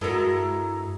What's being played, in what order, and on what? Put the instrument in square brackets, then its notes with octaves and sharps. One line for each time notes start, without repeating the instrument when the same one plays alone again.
[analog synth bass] G2 [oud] G#3 F#4 [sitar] E4 A4 A#4